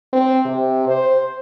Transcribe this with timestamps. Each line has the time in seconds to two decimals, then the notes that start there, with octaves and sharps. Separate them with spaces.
0.13 C4
0.45 C3
0.88 C5